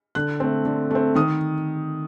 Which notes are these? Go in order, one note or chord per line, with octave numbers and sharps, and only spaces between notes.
D3 F#6
A3 C4
D3
A3 C4
D#3 D#6